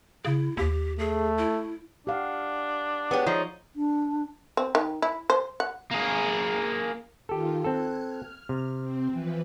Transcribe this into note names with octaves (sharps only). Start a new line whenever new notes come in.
C#3 E4
D#2 G4
A3 G#4
E4
D4 G4 F5 F#5
B3 G4 G#4 C#5
F3 D#4 C#5 D5
D4
C4
D#3
E4
C5
F#5
A#3 G#4
D#3 F4 G4 A4
C4 A4 F#6 G#6
F6
C3
C4
E3 F3 B4